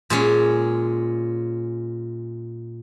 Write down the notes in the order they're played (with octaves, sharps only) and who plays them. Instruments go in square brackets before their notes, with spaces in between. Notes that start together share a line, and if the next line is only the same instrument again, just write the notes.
[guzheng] A#2 G#3 C#4